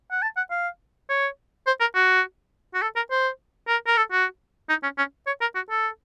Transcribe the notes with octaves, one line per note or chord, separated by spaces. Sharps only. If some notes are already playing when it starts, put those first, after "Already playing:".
F#5
A5
F#5
F5
C#5
C5
A#4
F#4
F#4
A4
A#4
C5
A#4
A#4
A4
F#4
D#4
C#4
C#4
C#5
A#4
F#4
A4